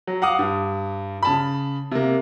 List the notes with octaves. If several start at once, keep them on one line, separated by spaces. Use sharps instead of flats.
F#3
F5 F#5 D6 D#6
G2
C#3 A5 B5
C3 A#3